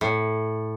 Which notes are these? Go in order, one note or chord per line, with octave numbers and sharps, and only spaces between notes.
A2